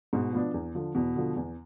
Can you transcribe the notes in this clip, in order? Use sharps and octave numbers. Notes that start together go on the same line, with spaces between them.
G#2 B2
F3 B3 D4
E2
D3 F3
E2 B2
D3 F3
E2